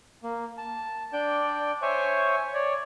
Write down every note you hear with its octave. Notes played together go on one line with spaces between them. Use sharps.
A#3
A5
D4 D5 G5 G6
C5 C#5 E5 G#5 C#6
C#5 D5